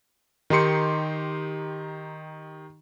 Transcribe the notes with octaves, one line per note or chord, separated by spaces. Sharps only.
D#3 D#4 G4 C6 C#7